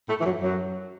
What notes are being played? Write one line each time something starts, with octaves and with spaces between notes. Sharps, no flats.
A2 A3
E3
F#2 F#3
F#2 F#3